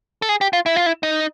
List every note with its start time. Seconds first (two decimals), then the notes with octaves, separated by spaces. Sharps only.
0.22 A4
0.29 G#4
0.41 G4
0.53 F4
0.66 E4
0.76 F4
0.86 E4
1.03 D#4